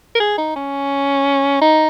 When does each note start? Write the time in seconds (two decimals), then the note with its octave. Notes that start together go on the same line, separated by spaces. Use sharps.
0.15 A#4
0.20 G#4
0.38 D#4
0.56 C#4
1.62 D#4